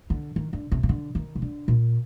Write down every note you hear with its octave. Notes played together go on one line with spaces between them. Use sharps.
D3
D#3
D3
C3
C3
D3
D#3
C3
D3
A#2